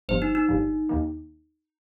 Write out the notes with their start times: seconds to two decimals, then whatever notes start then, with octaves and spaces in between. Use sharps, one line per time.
0.09 G1 G2 F3 C5
0.22 D#4
0.35 D#4
0.48 G1 G2 F3
0.89 D#2 D#3 A#3